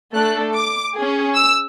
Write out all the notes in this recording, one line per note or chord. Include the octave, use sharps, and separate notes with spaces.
A3 D4 A4 F#6
D6
G#4
C#4
E6